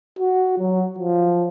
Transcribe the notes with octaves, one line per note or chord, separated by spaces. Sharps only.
F#4
F#3
F3